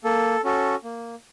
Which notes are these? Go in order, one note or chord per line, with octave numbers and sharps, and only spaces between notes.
A#3 A4
C#4 F#4 A4
A#3